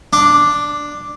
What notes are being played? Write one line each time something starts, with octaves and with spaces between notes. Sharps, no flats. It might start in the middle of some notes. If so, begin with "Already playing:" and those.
D4